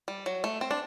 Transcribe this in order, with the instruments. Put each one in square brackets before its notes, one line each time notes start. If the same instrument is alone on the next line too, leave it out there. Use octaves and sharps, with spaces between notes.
[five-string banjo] G3
F#3
A3
C4
D4